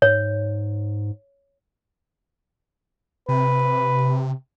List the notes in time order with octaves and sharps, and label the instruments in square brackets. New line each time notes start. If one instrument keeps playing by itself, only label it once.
[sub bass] G#2 [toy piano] C#5
[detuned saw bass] C3 [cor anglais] B4